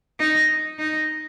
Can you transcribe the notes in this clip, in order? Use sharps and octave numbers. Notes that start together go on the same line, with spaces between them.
D#4
D#4